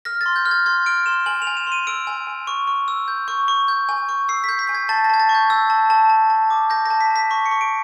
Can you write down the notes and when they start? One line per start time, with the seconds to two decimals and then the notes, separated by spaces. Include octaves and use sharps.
0.05 F6 A#6
0.21 A6
0.26 C6
0.36 G6
0.46 F6
0.51 G#6
0.66 C6 G#6
0.86 F6 D7
1.06 C6 E7
1.26 G#5 F#7
1.42 F7
1.47 G#5
1.57 E7
1.67 C6 D#7
1.87 E6 D7
2.07 G#5
2.27 G#5
2.47 C#6
2.67 C#6
2.88 E6
3.08 G6
3.28 C#6
3.48 C#6
3.68 G6
3.89 G#5
4.09 C#6
4.29 E6 C7
4.44 G6 B6
4.59 B6
4.67 G#5 G6
4.75 G#6
4.89 A5 A6
5.04 A#6
5.10 A5 G#6
5.20 A6
5.29 C#6
5.35 G6
5.50 E6 G#6
5.70 A5
5.90 A5
6.10 A5
6.30 A5
6.50 D6
6.70 G6 A#6
6.85 A5 A#6
7.01 B6
7.11 A5
7.16 B6
7.31 C#6 B6
7.46 C#7
7.51 C#6
7.61 D7